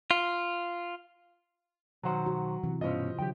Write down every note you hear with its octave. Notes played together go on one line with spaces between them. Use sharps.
F4
B1 D#3 F#3 C5 F#5
F#4
C3 E3
G2 B2 C#4 F4 C5 D#5
D3 F#3 G4 G5